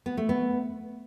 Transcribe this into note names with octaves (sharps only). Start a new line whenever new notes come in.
B3
A3
B3